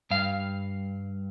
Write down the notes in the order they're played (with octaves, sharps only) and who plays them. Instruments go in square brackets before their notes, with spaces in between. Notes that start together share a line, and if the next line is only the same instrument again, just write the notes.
[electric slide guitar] G2 F5